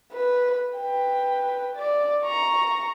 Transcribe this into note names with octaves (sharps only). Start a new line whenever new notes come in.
B4
B4 G5
D5
A#5 C#6